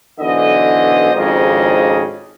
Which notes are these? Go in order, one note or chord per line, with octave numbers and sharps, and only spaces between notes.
B1 D3 E3 C5 D#5
G#1 F2 G#2 C#3 D4 D#5